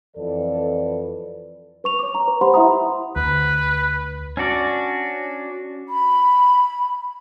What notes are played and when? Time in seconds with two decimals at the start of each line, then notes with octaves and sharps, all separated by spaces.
0.17 F2 E3 A4 B4 D5
1.84 B4 C#6 F7
1.99 C#5 D6
2.15 A#5
2.27 B4
2.41 G4 C5 F#5 B5 C6
2.54 E4 E5 F#5 A#5 D#6
3.16 D2 B4
4.37 C#4 D4 F#4 D5
5.89 B5